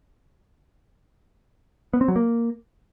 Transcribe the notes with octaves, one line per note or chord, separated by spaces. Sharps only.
B3
C4
F#3
A#3